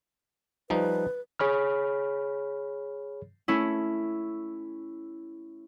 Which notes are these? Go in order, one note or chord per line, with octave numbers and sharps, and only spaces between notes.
F3 G3 D#4 B4
G#4 C#5 B5 F6
A3 C#4 E4